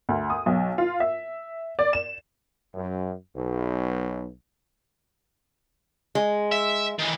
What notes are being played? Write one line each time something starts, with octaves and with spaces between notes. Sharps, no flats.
D2
D#6
B1
F4
E5
D5
E7
F#2
B1
G#3
E5
D#3 E3